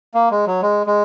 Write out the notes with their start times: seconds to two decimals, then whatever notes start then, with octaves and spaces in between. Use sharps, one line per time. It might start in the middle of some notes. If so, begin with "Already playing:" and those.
0.14 A#3
0.31 G#3
0.47 F#3
0.62 G#3
0.87 G#3